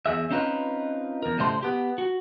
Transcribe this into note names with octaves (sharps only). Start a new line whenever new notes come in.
E2 G#4 E5
C4 C#4 D#4 F4 B4
E2 A#4
A2 C#3 G3 A3 C5 C6
B3 G4
F#4